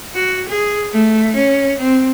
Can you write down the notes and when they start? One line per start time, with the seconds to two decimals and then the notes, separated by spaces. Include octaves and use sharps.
0.15 F#4
0.48 G#4
0.93 A3
1.35 C#4
1.79 C4